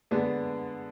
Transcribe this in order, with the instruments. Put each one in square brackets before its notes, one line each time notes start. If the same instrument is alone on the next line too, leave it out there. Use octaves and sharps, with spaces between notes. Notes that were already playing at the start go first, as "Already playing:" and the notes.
[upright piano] D3 G#3 B3 D4